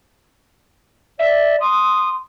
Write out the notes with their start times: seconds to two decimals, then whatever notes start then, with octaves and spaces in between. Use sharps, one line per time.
1.19 D5 E5
1.61 C6 D#6